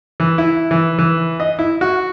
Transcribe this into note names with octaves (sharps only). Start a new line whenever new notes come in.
E3
E4
E3
E3
D#5
E4
F#4